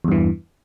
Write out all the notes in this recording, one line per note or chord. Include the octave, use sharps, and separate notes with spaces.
E2 G2 E3